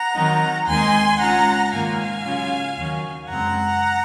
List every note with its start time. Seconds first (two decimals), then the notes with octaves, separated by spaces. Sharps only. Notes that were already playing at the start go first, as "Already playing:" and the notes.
Already playing: F#5 A#5
0.14 D#3 F#3 C4 D#4
0.66 D#2 D#3 G#3 C4 D#4 G#5 C6
1.19 C#3 G#3 C#4 F4 F#5 A#5
1.71 G#2 D#3 A#3 C#4 F4 F5 G#5
2.24 C#3 F#3 C#4 F4
2.76 D#2 D#3 F#3 C#4
3.28 F#2 C#3 G#3 C4 F#5 A#5